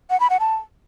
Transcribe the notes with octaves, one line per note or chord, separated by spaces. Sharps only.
F#5
B5
F#5
A5